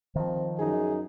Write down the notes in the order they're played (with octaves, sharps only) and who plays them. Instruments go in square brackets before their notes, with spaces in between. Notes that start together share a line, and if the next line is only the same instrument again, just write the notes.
[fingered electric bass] D#3 F3 [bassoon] C4
[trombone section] F#2 D#4 [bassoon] G#4